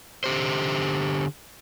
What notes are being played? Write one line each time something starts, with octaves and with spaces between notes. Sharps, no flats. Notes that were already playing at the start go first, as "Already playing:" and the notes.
D3 G4 C5